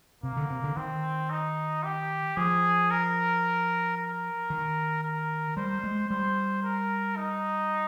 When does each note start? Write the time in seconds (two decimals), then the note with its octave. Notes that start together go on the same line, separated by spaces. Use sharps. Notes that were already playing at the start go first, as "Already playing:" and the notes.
0.23 C3 A#3
0.37 D3
0.50 C3
0.64 D3
0.77 D#3 C4
1.30 D#4
1.84 G4
2.37 F3 G#4
2.91 A#4
3.97 A#4
4.50 D#3
5.03 A#4
5.57 G3 C5
5.84 G#3
6.10 G3 C5
6.63 A#4
7.17 D#4